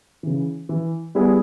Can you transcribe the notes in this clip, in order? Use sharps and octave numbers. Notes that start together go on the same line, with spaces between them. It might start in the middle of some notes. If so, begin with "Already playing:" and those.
C#3 E3
E3
G3 B3 E4 G#4